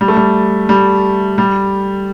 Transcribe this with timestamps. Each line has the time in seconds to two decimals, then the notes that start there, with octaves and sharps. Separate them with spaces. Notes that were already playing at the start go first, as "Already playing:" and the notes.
0.01 G3
0.08 A3
0.17 G3
0.69 G3
1.38 G3